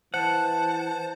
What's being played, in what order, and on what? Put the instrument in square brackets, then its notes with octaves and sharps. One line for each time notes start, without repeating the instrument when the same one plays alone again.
[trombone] E3 [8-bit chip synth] C5 [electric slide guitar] F#5 [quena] A5